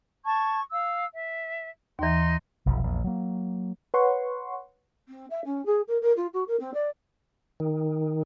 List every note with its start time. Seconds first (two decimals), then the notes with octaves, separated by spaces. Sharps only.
0.24 A5 C#6 G#6
0.71 F5 E6
1.15 E5
1.99 D#2 E3 D#4 C6
2.66 F1 B1 F3
2.83 A#1 E2
3.04 F#3 A#3
3.94 B4 C#5 F#5 C6 C#6
5.08 C4
5.30 E5
5.45 C#4
5.66 G#4
5.88 A#4
6.02 A#4
6.17 F4
6.34 F#4
6.48 A#4
6.60 C4
6.74 D5
7.60 D#3